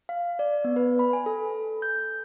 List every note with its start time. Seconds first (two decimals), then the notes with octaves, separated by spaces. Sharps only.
0.09 F5
0.39 D5
0.64 B3
0.76 B4
0.99 B5
1.13 G#5
1.26 A4
1.82 G6